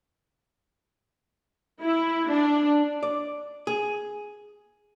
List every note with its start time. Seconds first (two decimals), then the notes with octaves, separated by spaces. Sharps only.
1.82 E4
2.30 D4
3.03 D5
3.67 G#4